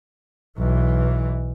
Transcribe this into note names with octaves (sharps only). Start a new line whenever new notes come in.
B1 E3